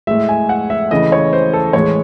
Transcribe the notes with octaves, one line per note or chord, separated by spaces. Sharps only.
A2 G#3 E5
G#5
F#5
E5
C#3 E3 A3 D#5
C#5
C5
A4
A2 E3 G#3 C#5